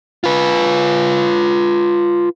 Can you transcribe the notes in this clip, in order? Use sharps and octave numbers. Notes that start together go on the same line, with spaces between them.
F4 B4